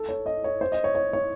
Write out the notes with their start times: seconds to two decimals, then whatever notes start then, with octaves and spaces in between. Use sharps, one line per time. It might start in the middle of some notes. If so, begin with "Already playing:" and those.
Already playing: A4
0.09 C#5
0.26 D#5
0.44 C#5
0.61 C5
0.72 D#5
0.84 C#5
0.95 C#5
1.13 C#5